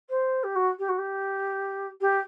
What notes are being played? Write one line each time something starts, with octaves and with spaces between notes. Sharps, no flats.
C5
G4
F#4
G4
F#4
G4
G4